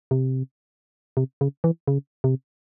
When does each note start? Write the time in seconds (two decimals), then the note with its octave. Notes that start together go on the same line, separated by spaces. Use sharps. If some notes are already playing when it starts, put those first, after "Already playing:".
0.11 C3
1.17 C3
1.41 C#3
1.64 E3
1.88 C#3
2.24 C3